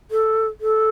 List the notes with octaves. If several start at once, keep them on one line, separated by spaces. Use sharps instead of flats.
A4
A4